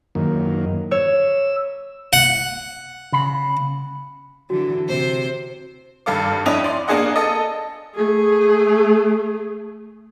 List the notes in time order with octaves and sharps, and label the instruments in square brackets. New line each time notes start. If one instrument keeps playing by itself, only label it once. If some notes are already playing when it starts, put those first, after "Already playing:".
[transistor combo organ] F#2 D#3 A#3
[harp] C#5 [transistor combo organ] E6
[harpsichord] F#5
[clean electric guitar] C#3 B5
[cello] D3 E3 [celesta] F#4
[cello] C3 [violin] C5
[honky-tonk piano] G#1 G2 A4 F5 D6
F2 C#4 D4 E4 D#5 F7
D5 C6 D6
A#3 D4 G#4 D#5 F#5
A4 D#5
[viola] A3 G#4